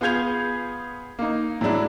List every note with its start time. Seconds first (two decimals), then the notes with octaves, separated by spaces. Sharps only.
0.01 B3 F4 G#4 G6 G#6 F7
1.19 A#3 D#4
1.61 A2 F#3 G#3 D4 E4